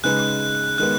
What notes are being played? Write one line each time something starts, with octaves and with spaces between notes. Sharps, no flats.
C#3 G#3 D#4 G#4 B4 F#6
D#3 G#3 B3 F#6